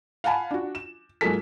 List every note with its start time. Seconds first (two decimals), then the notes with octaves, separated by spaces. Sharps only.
0.24 F5 F#5 G#5 A5 B5
0.51 D4 F#4
0.75 E7
1.21 G#2 F#3 A#3 G#4 A4 B6